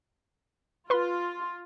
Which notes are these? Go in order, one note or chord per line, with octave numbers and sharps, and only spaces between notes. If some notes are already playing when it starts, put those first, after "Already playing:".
F4 B4 C6